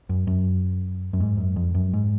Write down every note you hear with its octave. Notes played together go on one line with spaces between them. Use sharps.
F#2
F#2
F#2
G#2
F#2
F2
F#2
G#2